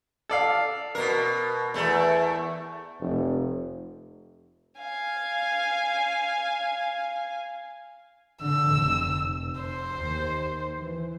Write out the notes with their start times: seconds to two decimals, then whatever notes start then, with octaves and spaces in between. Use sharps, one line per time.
0.29 A4 D5 F5
0.95 B2 A#4
1.74 E2 A3
3.00 F1
4.79 F5 G#5
8.42 D3 E6
8.74 F1
9.61 C5
9.93 D#2
10.77 E3